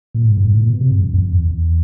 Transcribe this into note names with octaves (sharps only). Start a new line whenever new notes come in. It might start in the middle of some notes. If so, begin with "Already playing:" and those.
A#2
A2
G#2
G2
G#2
A2
A#2
B2
C3
G2
F2
E2
F2
E2
E2